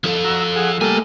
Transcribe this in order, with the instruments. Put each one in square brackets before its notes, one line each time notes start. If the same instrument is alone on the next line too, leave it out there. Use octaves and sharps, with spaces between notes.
[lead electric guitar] F3 A4
[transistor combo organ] F#4 A#5 E6
G#4 F#5
[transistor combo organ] G3 A#3 A4 [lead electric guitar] A3 G#5